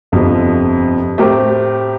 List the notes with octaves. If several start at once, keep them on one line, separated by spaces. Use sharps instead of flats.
G1 F2 C3 F3
A2 A3 C4 G4 A#4